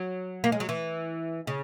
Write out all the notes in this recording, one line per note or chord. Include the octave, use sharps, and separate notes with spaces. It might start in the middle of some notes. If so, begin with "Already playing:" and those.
Already playing: F#3
A#3
G#3
F#3
E3
C#3